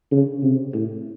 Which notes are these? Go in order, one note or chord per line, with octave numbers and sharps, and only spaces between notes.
C#3
C3
A2